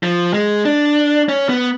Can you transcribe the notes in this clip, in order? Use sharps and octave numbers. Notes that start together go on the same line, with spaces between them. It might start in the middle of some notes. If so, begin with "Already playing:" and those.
F3
G#3
D4
C#4
B3